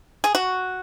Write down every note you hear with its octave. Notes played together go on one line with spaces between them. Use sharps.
G#4
F#4